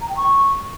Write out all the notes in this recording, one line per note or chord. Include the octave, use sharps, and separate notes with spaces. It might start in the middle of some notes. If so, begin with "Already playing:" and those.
A#5
G5
C#6